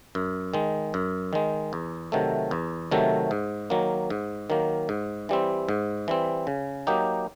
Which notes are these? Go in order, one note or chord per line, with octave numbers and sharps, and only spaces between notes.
F#2
D#3 G#3
F#2
D#3 G#3
E2
C3 D#3 F#3 A3
E2
C3 D#3 F#3 A3
G#2
D#3 F#3 A#3
G#2
D#3 F#3 A#3
G#2
E3 G3 C4
G#2
E3 G3 C4
C#3
F#3 A#3 D#4 G4